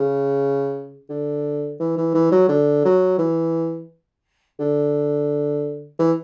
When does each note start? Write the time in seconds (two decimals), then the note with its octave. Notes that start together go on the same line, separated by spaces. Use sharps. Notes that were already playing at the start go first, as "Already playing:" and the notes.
Already playing: C#3
1.10 D3
1.80 E3
1.97 E3
2.14 E3
2.32 F#3
2.49 D3
2.85 F#3
3.19 E3
4.59 D3
5.99 E3